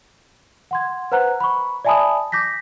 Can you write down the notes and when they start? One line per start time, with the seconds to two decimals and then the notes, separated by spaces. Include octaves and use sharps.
0.71 F#5 C6 G#6
1.12 B4 C5 F#5 A#5 F#6
1.40 B5 C#6
1.85 D5 E5 G#5 A5 B5 D#6
2.32 D6 G6 A#6 B6